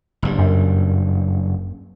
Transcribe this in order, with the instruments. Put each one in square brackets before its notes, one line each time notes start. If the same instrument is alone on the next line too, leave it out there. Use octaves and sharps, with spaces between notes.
[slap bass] F#1 G2
[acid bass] F#2